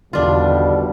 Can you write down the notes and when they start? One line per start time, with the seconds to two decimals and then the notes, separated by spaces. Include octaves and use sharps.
0.13 G#1 E2 B2 D3 G3 D4 F4 F5